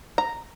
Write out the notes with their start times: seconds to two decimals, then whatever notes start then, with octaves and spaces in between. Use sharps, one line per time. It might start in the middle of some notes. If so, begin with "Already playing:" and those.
0.18 A#5